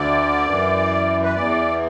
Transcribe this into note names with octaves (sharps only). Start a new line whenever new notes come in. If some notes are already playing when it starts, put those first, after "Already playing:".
Already playing: D2 D3 D5
F#2 E3
B4
E2 E3 D5